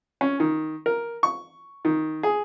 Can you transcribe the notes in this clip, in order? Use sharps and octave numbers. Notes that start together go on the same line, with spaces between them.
C#4
D#3
A#4
C#6
D#3
G#4